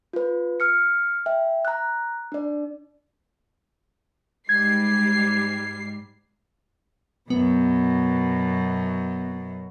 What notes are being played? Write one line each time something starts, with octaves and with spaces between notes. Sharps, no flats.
F4 B4
E6 F6 C#7
E5 G5
A#5 F#6
D4 D5
G#2 G3 G#6 C7
F#2 B2 B3